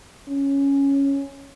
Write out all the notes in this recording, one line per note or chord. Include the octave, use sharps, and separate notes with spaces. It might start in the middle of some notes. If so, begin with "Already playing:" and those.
C#4